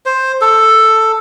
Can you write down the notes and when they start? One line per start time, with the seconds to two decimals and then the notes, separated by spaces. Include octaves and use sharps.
0.06 C5
0.41 A4